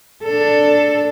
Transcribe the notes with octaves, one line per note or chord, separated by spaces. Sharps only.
D4 A4